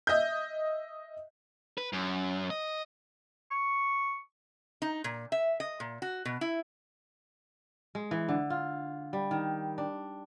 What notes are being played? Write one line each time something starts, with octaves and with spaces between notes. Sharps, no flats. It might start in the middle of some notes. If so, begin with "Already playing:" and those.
D#5 E5 G6
B4
F#2
D#5
C#6
D#4
A#2
E5
D#5
A#2
F#4
B2
E4
G#3
E3
D3
F4
G3
D#3
D4